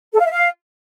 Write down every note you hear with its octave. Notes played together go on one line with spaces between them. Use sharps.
A4
F5
E5
F5